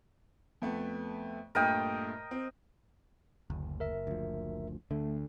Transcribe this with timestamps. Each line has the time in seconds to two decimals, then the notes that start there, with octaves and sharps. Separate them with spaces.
0.62 F2 A3 B3
1.55 G2 A#2 A3 A#4 D#5 G5
2.31 C4
3.50 F#1 D2
3.80 A#4 E5
4.07 D2 F3
4.91 D2 D3 A3